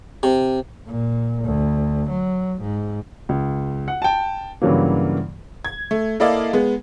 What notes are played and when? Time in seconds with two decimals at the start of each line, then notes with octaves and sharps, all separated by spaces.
0.23 C3
0.87 A#2
1.44 D2
2.10 F#3
2.62 G#2
3.29 C#2
3.88 F#5
4.02 G5 A5
4.62 G2 C#3 E3 F#3 A#3
5.65 G#6
5.91 A3
6.20 A#3 E4 A4 D5 D#5 F5
6.53 G#3 B3